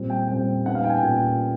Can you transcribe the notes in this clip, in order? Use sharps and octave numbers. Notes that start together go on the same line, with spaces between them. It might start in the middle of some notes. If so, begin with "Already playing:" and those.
Already playing: A#2 G3 C4
G5
A#2 G3 C4 G5
A#2 G3 B3 D#4 F#5
F5
G5
G#5
G5
A#2